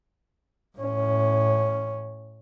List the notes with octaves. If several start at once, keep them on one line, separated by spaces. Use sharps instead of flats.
A2 C#4